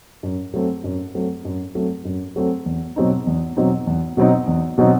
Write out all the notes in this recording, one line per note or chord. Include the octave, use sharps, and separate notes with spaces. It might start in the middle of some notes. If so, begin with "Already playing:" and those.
F#2
F#3 A3 C4
F#2
F#3 A3 C4
F#2
F#3 A3 C4
F#2
F#3 A3 C4
E2
B2 F#3 C4 D#4
E2
B2 F#3 C4 D#4
E2
B2 F#3 C4 D#4
E2
B2 F#3 C4 D#4